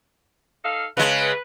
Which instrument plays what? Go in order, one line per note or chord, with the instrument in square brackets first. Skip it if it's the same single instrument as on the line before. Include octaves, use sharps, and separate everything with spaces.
[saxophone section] D#4 A4 F5
[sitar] C#3 G#3 [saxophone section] B4